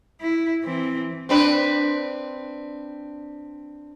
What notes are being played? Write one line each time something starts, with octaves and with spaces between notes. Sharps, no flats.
E4
E3 C4
C4 D4 B4